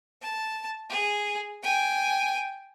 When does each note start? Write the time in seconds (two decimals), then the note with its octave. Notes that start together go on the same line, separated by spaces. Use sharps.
0.21 A5
0.90 G#4
1.63 G5 G#5